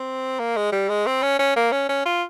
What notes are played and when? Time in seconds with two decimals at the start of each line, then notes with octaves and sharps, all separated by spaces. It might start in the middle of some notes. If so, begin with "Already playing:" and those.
Already playing: C4
0.39 A#3
0.57 G#3
0.72 G3
0.89 G#3
1.06 C4
1.23 C#4
1.39 C#4
1.56 A#3
1.72 C#4
1.89 C#4
2.05 F4